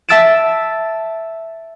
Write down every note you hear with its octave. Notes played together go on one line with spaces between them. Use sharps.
E5 A5 E6 A6 D7 E7